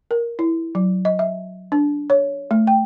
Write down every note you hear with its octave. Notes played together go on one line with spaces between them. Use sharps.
A#4
E4
F#3
D#5
E5
D4
C#5
A3
G5